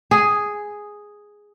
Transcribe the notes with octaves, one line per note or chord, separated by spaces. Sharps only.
G#4